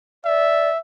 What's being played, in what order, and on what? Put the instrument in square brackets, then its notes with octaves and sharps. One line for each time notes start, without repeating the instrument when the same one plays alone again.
[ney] D5 [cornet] E5